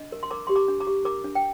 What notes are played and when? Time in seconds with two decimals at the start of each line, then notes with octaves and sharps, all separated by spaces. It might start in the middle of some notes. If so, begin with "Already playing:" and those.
Already playing: D4 D#5
0.12 A#4
0.23 C6
0.31 A#4 A#5 D6
0.47 G4 C6
0.56 A#5 D6
0.68 D4
0.80 A#5 D6
0.87 G4
1.05 A#4 A#5 D6
1.24 D4
1.35 G5